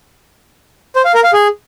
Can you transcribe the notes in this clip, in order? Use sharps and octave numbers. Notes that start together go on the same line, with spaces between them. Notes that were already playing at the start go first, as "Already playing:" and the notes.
C5
F5
A#4
F5
G#4